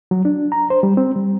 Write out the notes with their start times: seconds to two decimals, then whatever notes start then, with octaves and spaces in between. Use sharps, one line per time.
0.11 F#3
0.25 D4
0.52 A#5
0.70 C5
0.83 G3
0.97 C4
1.16 G3